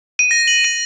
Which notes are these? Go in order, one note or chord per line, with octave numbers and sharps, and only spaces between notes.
D#7
A#6
F#7
D#7